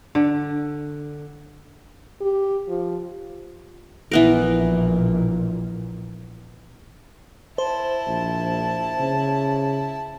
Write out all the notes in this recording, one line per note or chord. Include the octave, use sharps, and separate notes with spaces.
D3
G4
F3
A#1 A#2 E3 B3 A#4
E4 C5 A5
A#1
C#3